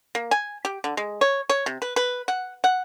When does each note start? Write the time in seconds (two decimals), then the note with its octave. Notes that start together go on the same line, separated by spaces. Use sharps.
0.15 A#3
0.31 G#5
0.65 G4
0.84 D3
0.97 G#3
1.21 C#5
1.49 C#5
1.66 C3
1.82 B4
1.96 B4
2.28 F#5
2.64 F#5